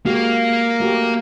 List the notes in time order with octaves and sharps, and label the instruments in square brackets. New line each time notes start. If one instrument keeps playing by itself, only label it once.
[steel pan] G#3 F#4 G4 [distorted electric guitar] A#3
[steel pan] A3 F#4 G4